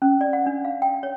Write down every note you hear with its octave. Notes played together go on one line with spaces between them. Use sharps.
C#4
D5
F#5
D4
F5
G5
C#5